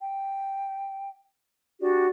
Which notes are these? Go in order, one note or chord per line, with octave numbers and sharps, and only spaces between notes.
G5
D4 F#4 G4 D5